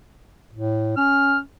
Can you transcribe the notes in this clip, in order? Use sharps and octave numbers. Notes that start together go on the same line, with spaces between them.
A2
C#4 F6